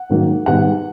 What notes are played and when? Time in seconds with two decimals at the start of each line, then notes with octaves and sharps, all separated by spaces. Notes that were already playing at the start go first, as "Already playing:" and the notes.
Already playing: F#5
0.10 G#2 D#3 F#3 A#3
0.46 G#2 D#3 G3 B3 F#5